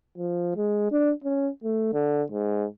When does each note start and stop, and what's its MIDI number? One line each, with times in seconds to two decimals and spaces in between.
0.18 0.56 53
0.56 0.90 56
0.92 1.12 62
1.24 1.49 61
1.64 1.93 57
1.93 2.23 50
2.31 2.65 44